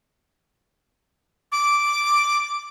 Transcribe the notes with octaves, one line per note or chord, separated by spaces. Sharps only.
D6